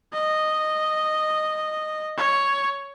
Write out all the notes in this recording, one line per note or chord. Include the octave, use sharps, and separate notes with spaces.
D#5
C#5